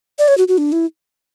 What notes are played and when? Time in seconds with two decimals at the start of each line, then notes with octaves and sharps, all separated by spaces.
0.19 D5
0.28 C#5
0.38 F#4
0.48 F#4
0.58 D4
0.72 E4